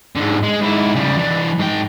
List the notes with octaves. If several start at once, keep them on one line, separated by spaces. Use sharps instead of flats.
G#2 D3
G#3
G#2 E4
C#3 G3
E3 D4
G#2 G5